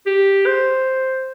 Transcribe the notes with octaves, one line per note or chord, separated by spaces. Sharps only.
G4
C5